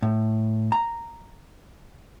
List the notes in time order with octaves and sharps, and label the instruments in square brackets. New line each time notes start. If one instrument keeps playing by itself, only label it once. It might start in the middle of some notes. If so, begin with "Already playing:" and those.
[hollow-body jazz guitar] A2
A#5